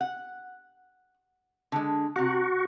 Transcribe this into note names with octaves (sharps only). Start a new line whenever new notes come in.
F#5
D3 G#3
C3 F#4 F#5